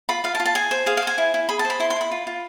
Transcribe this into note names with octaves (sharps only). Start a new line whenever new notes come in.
F4 B5
F4 F5
A5
F4
A5
G#4 G#5
C5
G#4 F5
F5
C5 G#5
E4
E4
G#4 B5
A5
C5
B5
E4 C6
C6
E4 B5
F4
F4